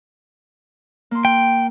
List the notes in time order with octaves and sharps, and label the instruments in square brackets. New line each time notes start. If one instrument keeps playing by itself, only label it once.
[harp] A#3 C6
[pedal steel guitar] G5